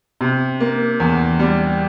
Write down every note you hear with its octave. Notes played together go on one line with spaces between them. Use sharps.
C3
A#3
E2
G3